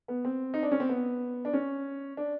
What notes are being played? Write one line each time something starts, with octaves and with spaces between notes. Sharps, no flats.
B3
C4
D#4
D4
C#4
C4
B3
D4
C#4
D4